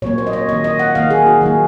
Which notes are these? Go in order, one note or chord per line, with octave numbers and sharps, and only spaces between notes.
A#2 F#3 A#3 C#5
C5
D#5
C#5
D#3 A#3 D#5
D#5
F#5
D#3 A#3 F5
G#4
F#4
D#3 F#3 A#3